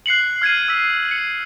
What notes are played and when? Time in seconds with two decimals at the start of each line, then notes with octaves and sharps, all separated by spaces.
0.06 F#6 C7 C#7 F#7
0.42 F6 G#6 C7 D#7
0.68 E6 B6
1.11 C#7